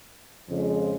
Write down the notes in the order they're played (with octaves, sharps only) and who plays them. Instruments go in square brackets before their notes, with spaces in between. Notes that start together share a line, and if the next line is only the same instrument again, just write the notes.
[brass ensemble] F2 C#3 F3 G#3